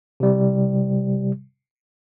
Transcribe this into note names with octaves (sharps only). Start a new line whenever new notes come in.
C3 G3